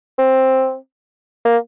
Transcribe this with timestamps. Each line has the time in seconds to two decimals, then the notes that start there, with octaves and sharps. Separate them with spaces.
0.19 C4
1.45 A#3